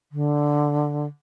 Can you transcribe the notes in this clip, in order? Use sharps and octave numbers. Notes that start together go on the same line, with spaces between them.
D3